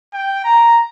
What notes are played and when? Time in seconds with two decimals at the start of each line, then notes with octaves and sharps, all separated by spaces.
0.14 G5
0.44 A#5